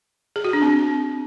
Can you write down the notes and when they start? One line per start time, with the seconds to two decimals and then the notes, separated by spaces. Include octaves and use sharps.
0.36 G#4
0.45 F#4
0.53 D4
0.62 C4